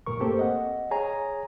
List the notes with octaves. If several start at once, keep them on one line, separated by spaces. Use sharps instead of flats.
C2 G2 A#2 A#4 C#6
A3 A#3 C4 G4 A4 C5
D#5 F#5
G#4 C#5 G#5 A#5